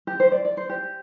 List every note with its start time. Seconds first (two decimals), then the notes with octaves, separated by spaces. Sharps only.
0.07 G4
0.20 C5
0.32 D5
0.45 D5
0.57 C5
0.69 G4